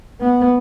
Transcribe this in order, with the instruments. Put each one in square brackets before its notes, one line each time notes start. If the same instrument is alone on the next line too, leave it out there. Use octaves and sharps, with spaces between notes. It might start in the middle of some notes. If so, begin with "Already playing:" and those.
[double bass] B3